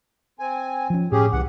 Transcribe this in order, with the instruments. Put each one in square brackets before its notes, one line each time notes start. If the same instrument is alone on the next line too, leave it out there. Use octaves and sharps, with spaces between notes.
[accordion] C4 G#5
[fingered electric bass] F3 C#4
[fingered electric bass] A2 [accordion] C#4 G4 G#4
[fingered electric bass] C2 [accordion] E3 F#5